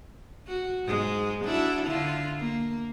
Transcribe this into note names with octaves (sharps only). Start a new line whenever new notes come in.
F#4
G#2 G#3
D4 E4 F#4
D3 E4 F4
A#3